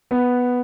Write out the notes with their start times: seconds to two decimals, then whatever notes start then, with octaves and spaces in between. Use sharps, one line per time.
0.11 B3